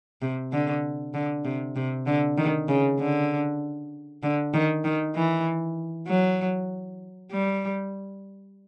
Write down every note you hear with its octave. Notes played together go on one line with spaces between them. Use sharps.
C3
D3
D3
C3
C3
D3
D#3
C#3
D3
D3
D#3
D#3
E3
F#3
G3